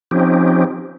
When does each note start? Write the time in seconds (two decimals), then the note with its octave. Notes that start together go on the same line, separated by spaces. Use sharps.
0.11 F3 C4 C#4 D#4 G4